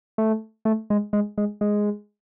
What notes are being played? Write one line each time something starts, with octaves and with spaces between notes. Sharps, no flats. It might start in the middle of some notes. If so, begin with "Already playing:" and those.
A3
A3
G#3
G#3
G#3
G#3